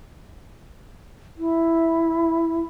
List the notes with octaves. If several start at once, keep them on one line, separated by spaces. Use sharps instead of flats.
E4